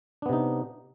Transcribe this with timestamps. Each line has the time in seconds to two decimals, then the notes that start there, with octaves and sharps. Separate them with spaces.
0.22 D4
0.26 B3
0.29 C3
0.33 D#4